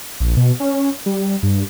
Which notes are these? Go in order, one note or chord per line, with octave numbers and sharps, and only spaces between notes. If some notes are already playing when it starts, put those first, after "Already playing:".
A#1
B2
C#4
G3
G2